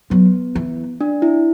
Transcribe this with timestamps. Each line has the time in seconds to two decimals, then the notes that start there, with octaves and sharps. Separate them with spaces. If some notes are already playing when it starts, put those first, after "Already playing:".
0.10 F#3 B3
0.55 E3
1.01 D4
1.22 E4